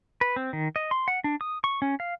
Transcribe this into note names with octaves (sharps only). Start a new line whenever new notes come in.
B4
C4
D#3
D#5
C6
F#5
D4
D#6
C#6
C#4
F5